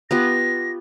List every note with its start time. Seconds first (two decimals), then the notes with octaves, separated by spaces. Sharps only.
0.11 B3 F4 G4 A#6